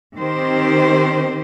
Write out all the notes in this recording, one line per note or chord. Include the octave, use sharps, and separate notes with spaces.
D#3 C4 G4 C5